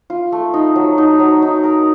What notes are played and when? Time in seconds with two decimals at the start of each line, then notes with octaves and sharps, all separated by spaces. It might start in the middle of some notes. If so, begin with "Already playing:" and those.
0.10 F4
0.32 A3
0.54 D#4
0.76 F#3
0.98 D#4
1.20 F#3
1.42 D#4
1.64 A#4